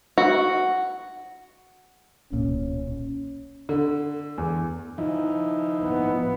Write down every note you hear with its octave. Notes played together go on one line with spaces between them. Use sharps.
F#4
D1 B1 A#2 C#4
D3
E2
F3 D#4 E4
B3